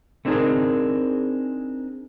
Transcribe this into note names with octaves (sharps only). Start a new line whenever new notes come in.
A3 C4 D4 D#4 G#4 A#4